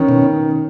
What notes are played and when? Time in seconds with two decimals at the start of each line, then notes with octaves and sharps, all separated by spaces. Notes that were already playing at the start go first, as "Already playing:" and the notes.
Already playing: D#3 C#4
0.09 B2